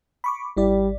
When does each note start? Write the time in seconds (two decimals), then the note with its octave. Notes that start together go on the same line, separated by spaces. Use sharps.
0.24 B5 C#6 D6
0.57 G#1 G3 E4 D5